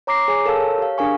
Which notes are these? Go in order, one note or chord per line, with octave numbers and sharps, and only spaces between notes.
C#5 A#5 D6 A#6 C7
G#4 C#5 G#5
A4 A#4 C#5 F5 A5 E6
C#5
G4 F5
D4 G#4 A#4 F5 G#5 C#6